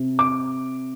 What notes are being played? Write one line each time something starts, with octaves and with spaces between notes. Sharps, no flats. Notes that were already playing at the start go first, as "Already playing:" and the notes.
Already playing: C3
D6